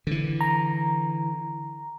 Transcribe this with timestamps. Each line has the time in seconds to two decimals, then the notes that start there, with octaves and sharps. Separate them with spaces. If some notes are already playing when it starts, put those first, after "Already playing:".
0.07 D3 E3
0.41 A#5